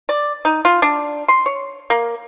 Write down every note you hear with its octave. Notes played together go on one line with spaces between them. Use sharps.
D5
D#4
F4
D4
C6
C#5
A#3